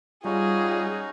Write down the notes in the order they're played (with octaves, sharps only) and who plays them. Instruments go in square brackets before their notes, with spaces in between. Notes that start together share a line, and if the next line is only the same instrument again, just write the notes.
[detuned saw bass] G3 [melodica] C#4 D#4 F#4 [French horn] F4 [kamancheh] G#4